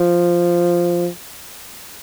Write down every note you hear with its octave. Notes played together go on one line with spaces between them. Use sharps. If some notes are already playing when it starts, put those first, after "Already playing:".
Already playing: F3